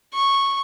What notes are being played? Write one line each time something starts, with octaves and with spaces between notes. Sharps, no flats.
C#6